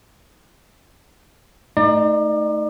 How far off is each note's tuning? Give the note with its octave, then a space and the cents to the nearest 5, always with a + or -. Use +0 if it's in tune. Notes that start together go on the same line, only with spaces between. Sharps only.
A3 +0 D#4 +5 D5 +35